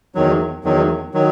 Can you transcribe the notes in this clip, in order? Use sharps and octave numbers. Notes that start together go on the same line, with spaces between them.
E2 D#3 F#3
E2 D#3 F#3
D#3 F#3